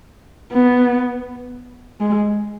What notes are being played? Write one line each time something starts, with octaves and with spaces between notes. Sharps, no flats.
B3
G#3